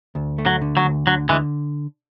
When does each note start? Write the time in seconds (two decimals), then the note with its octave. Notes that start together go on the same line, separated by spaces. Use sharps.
0.15 D2
0.38 A3
0.46 F#3
0.61 D3
0.77 F#3
0.84 D2
1.07 D3 F#3
1.29 D3 E3 G#3